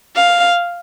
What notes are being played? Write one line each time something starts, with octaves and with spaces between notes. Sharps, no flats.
F5